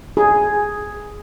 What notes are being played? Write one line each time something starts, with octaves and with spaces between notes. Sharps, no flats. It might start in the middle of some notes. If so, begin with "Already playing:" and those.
G#4